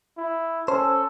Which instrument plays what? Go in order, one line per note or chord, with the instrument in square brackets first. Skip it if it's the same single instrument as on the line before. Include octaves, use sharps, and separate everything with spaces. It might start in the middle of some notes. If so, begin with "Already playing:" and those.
[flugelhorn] E4
[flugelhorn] C#4 [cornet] A4 [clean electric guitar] C5